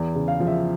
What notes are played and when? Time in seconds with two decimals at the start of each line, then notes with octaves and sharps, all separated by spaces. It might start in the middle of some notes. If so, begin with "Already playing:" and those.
Already playing: E2
0.15 C#3
0.28 F5
0.40 F3
0.47 E5